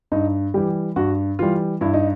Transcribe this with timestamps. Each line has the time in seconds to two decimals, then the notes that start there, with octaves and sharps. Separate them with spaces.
0.12 G2 D#4
0.54 E3 G3 G4
0.96 G2 F#4
1.39 E3 G3 F4
1.81 G2 E4
1.93 D#4